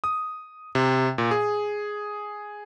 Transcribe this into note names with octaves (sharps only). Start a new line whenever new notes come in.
D#6
C3
A#2
G#4